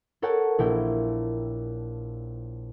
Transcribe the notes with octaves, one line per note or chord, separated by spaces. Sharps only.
A4 A#4 C#5 F#5 G5 A5
A#1 E4 A#4 G5